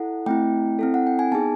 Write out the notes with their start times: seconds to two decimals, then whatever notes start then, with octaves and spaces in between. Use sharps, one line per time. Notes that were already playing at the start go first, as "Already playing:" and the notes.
Already playing: E4 A4 F#5
0.26 A3 C4 E4 G5
0.79 C4 E4 A4
0.94 F#5
1.07 G5
1.19 G#5
1.32 B3 D#4 G#4 A5